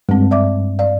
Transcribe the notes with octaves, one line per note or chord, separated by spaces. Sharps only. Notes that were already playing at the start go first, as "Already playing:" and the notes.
G2 G#3 C4
D5 E5 D6
D5 F5